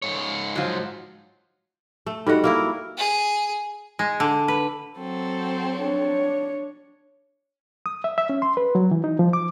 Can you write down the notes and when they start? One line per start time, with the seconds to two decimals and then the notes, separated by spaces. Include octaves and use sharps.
0.02 G#2 C#5
0.56 F3 F#3
2.06 A3
2.27 G3 D#4 F#4 A4 D#5
2.44 A#3 E4 A#4
2.98 G#4
3.99 G#3
4.20 D3
4.48 B4
4.96 F#3 C4 A4
5.76 D4 C#5
7.86 D#6
8.04 E5
8.18 E5
8.29 C#4
8.42 C6
8.57 B4
8.75 F#3
8.91 E3
9.04 D#4
9.19 F3
9.33 D6